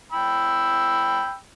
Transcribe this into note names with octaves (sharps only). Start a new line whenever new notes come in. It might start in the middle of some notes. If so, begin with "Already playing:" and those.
G5 B5 E6